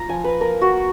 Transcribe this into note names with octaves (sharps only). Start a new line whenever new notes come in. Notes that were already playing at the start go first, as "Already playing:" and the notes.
Already playing: F4 A#5
F3 G#5
B4
A#3 A#4
F#4
A#3